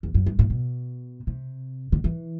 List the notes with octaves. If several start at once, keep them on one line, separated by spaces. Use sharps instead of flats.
E2
F#2
G2
A2
B2
C3
D3
E3